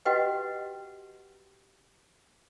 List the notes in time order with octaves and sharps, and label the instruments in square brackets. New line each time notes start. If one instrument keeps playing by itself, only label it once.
[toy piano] F#4 G4 B4 D#5 F#5 G5